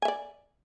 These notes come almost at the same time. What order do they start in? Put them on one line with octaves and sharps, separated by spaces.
G#5 E5 D5